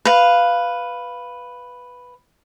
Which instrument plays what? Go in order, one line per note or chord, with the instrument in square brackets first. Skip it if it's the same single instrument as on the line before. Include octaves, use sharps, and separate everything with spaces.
[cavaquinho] B4 F5